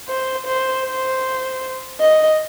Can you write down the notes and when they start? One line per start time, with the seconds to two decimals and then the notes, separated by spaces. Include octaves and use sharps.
0.09 C5
0.46 C5
0.85 C5
2.01 D#5